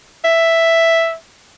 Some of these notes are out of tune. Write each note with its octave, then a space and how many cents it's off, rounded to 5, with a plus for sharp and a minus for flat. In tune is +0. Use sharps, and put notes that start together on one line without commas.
E5 +0